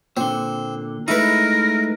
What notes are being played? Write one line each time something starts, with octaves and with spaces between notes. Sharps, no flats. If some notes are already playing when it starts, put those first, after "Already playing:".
A#2 D3 C4
G#3 A3 D#4 E4 A#4 B4